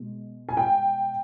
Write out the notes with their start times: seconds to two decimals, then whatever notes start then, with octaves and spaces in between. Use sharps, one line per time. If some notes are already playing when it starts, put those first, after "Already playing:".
Already playing: B2 G#3
0.49 G#5
0.57 G5